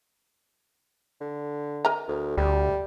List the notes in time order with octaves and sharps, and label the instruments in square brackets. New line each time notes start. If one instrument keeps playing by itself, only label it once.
[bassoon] D3
[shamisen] A#4 D#5 A#5
[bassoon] D2
[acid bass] D2 [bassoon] G3